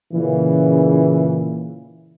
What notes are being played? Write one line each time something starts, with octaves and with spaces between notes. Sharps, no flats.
A#2 C#3 E3